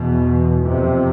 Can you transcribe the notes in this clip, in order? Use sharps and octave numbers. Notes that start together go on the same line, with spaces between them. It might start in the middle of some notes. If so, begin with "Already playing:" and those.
Already playing: E2 B2
F2 C3